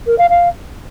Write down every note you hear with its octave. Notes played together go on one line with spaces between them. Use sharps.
A#4
F5
F5